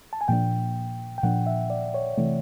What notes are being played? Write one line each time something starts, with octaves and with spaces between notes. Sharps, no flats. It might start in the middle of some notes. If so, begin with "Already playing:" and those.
A5
G#5
A#2 F3 A#3 D4 G5
G5
A#2 F3 A#3 D4 F#5
E5
D5
C#5
C3 E3 A3